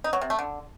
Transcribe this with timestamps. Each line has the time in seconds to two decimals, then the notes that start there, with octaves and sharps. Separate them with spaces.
0.04 D#4
0.13 F#3
0.21 C3
0.30 A3
0.39 D3